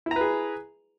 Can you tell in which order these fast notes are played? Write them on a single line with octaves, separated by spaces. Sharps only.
E4 A#5 B4 G#4